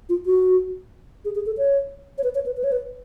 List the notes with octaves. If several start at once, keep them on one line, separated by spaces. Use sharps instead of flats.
F4
F#4
G#4
G#4
A4
C#5
C#5
B4
C#5
B4
B4
C#5
B4